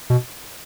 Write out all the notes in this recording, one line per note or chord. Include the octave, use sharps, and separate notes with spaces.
B2